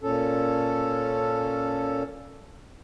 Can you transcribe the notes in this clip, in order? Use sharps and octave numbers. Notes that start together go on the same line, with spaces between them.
A#2 C#4 A4